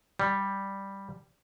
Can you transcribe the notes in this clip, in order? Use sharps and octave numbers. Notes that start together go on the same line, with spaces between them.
G3